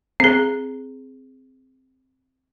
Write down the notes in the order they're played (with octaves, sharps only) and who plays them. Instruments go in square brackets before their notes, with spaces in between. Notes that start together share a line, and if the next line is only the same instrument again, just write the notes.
[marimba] C4 G#4